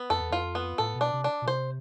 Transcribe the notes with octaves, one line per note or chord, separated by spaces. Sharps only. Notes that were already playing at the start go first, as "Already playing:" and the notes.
Already playing: B3
F2 A4
E2
F2 F4
B3
A2 A4
B2
D4
C3
D4
B2
C3 C5